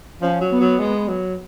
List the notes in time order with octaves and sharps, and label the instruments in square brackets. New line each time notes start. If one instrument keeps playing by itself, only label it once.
[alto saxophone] F3 [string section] C#4
[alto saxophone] F#3
[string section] B3
[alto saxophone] F#3
G#3
F#3